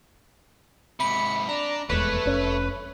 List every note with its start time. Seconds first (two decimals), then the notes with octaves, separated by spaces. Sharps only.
1.00 G#2 C3 B5 C#7
1.49 D4 D5 A#5
1.89 D#1 E2 G#3 A3 B4 C#5
2.25 F1 C#4